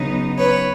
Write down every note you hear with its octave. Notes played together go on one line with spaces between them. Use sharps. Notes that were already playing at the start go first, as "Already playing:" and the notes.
Already playing: C#3 F#3 B3 D#4
B4 C#5